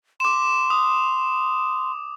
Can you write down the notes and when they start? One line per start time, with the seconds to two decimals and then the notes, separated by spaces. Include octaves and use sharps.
0.20 C6 D6 E7
0.70 D#6